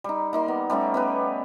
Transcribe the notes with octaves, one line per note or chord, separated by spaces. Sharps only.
G3 D#4
A#3 D#4 C6
B3
G3 A3 C#4 G4
B3 G4 B4